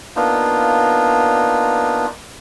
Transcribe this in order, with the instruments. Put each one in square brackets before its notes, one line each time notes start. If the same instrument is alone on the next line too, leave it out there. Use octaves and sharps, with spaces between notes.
[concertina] A#3 B3 D4 D#4 F4